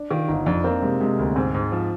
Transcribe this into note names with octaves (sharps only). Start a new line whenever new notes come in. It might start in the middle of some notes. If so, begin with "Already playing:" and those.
Already playing: D4
D#3 F4
G1 D#4
F2 D4
A#3 C4
C3 G#3
C3 G#3
D2 A#3
G#2 C4
G#2
F3